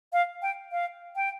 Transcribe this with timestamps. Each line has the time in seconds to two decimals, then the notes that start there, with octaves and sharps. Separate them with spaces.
0.13 F5
0.42 G5
0.72 F5
1.16 G5